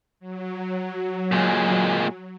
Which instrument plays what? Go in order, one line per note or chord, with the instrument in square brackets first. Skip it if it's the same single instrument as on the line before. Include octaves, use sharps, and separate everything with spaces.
[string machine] F#3
[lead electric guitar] A#2 G#3